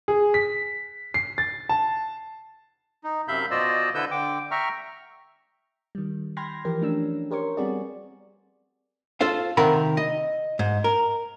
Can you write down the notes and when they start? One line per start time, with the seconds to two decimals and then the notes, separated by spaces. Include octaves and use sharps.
0.08 G#4
0.34 B6
1.14 C7
1.38 A6
1.69 A5
3.04 D#4
3.28 F#2 C3 E5 F5 B5 G6
3.51 B2 F4 C5 D5 D#5 E6
3.95 D3 E4 A4 B4 E6 G6
4.11 D3 G5 D6
4.51 E5 G5 A#5 C#6 F6
5.95 D#3 G3
6.37 G5 B5 C6 F6 G#6 A#6
6.65 E3 F3 G4 A#4
6.81 A3 C#4 D4 E6
7.31 G4 A#4 C5 C#5 C#6
7.57 G3 B3 C4 F#4 G#4 D5
9.21 F4 A4 C5 F5
9.57 C3 D#3 C4 A#4 F#5 B5
9.97 D#5
10.59 G#2
10.84 A#4